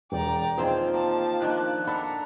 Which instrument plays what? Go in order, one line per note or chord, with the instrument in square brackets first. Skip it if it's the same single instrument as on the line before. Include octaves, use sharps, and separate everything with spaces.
[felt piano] E1 [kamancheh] D5 A#5 [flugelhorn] G5
[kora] D#3 C4 G#4 [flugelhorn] F3 [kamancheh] A#3 [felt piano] C5 G5
[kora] A#3 [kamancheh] A5
[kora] D#3 D4 [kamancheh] F#6
[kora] D4 A4 [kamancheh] F#5 A#5 [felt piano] B5